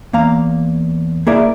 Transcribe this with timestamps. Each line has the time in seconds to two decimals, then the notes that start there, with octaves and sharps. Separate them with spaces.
0.13 E2 A#3 F5 A#5
1.27 A#3 E4 G#4 A#4 D5 E5